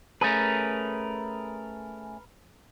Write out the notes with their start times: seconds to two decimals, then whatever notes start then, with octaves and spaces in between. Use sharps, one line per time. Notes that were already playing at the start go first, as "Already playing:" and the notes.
0.21 A3 C#4 G#4 A#4 B4